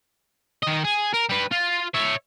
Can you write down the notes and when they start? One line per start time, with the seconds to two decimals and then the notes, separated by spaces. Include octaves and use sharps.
0.63 D#3 D#5
0.84 G#4
1.13 A#4
1.29 G3 B4
1.52 F4
1.95 C#5 E5